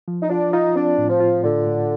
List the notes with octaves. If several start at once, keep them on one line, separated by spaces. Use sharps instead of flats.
F3
D#4
D4 F4
D#4 F4
C4 D4
A2
F3
F4
A2 D3
A2